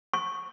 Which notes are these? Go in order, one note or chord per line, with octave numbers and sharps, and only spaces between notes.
C#6